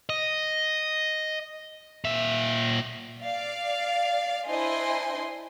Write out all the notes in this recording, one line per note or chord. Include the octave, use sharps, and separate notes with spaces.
D#5
A#2 E5
D5 F5
D4 E4 C5 D#5 G#5 C6